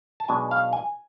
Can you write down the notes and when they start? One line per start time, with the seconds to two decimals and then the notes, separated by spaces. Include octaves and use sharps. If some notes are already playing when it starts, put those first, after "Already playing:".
0.20 A5
0.28 B1 B2 G#3 D4 G#5
0.51 F5
0.73 G#5